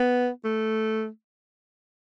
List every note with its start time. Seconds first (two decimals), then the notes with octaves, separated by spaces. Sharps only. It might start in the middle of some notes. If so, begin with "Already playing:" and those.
Already playing: B3
0.45 A3